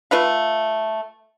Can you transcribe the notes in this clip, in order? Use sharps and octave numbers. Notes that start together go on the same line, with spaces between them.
A3 F4 B4 F5